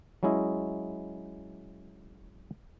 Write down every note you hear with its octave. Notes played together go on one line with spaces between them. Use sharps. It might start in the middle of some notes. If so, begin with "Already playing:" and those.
F#3 G#3 C#4 E4 D#5